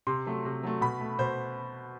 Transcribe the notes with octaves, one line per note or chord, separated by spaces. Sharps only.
C3 C6
F#3 A3
C3
F#3 A3
B2 B5
A3
B2 C5